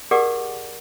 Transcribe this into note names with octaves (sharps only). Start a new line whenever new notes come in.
G4 G#4 A#4 D5 F#5 D6